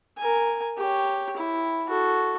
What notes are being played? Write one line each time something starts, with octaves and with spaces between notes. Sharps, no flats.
A#4 G#5
G4 C#5
E4
F#4 A4